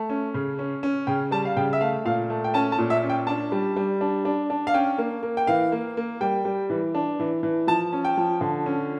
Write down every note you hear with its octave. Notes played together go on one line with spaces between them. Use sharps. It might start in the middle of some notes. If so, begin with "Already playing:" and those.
Already playing: A3
C#4
C#3
C#4
C#4
C#3 G5
G3 A5
F5
C#3 G5
E5
A3 F5
A#2 F5
A3
G5
C#4 A5
A5
A#2
E5
C#4
G5
D4 A5
G3
G3
D4
D4
D4
F5
C#4 G5
A#3
A#3
G5
E3 F5
A#3
A#3
G3 G5
G3
E3
D4
E3
E3
F3 A5
C#4
G5
F3
D3
C#4